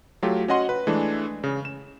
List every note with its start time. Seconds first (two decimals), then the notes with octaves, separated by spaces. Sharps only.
0.23 F#3 A3 F4 G4
0.48 C#4 F#4 D#5 F#5 C6
0.69 B4
0.87 E3 G#3 A3 D4
1.44 C#3
1.65 E7